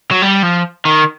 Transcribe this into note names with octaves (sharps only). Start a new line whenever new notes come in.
F#3
G3
F3
D#3